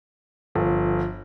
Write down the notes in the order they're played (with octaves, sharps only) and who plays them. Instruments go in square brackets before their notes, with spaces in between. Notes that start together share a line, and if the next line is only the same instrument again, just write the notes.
[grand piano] G1 [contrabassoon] F3